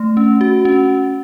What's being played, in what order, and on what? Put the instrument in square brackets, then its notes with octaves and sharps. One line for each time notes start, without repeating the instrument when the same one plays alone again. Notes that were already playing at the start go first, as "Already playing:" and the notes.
Already playing: [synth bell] A3
C#4
F#4
C#4